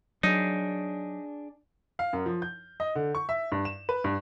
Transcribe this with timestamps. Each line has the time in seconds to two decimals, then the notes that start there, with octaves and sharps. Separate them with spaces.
0.23 F#3 D4 D#4 G#4
1.99 F5
2.13 F#2
2.26 F3
2.42 G6
2.80 D#5
2.95 D3
3.15 C#6
3.29 E5
3.52 G2
3.65 E7
3.89 B4
4.04 G2